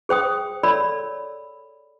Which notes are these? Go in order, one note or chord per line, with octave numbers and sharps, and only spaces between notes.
G#4 C5 G5 D#6
A4 C#5 D5 B5 E6